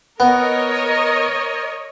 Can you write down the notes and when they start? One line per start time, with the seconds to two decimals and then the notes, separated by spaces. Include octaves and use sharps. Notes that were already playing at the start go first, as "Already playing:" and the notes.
0.20 B3 A#4 C#5 D#5